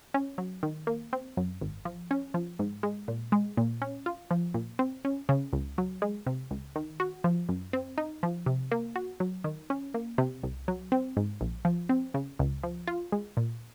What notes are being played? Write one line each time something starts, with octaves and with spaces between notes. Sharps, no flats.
C#4
F#3
D#3
A#3
C4
F#2
G#1
F3
C#4
F3
G#2
G#3
A#2
G#3
A#2
C#4
F4
F3
A#2
C4
C#4
C#3
C#2
F#3
G#3
C3
C#2
D#3
F#4
F3
F#2
C4
D#4
F3
C3
A#3
F#4
F#3
D#3
C#4
A#3
C3
C2
F#3
C4
G#2
A#1
F3
C4
C#3
C#2
F3
F4
G#3
A#2